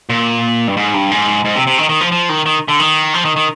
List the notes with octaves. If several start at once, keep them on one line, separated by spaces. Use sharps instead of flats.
A#2
G2
G#2
G2
G#2
G#2
C3
C3
D#3
D#3
F3
F3
D#3
D#3
D3
D#3
F3
D#3
D#3